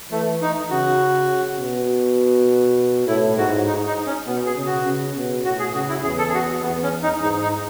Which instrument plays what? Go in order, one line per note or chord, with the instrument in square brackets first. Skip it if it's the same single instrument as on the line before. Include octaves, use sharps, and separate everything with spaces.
[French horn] E3 [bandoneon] A3
[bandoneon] D#4
[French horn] C#3 [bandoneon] F#4
[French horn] B2
[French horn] A2 [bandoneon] E4
[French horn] G#2 [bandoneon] F#4
[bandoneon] D#4
D#4
C#4
[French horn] B2 [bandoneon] B3
[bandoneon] G#4
[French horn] C#3
[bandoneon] F#4
[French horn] C#3
B2
[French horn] A2 [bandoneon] F#4
[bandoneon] G#4
[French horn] C#3 [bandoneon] F#4
[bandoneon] E4
[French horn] E2 [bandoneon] G#4
[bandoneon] A4
G#4
F#4
[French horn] E2 [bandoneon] B3
[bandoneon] C#4
D#4
[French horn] G#2 [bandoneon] D#4
[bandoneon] D#4